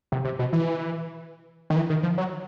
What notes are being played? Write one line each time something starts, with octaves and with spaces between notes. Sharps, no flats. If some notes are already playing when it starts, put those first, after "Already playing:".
C3
C3
B2
E3
D#3
E3
D#3
F3
F#3